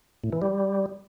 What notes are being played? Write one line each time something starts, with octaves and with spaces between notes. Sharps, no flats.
A2
E3
G3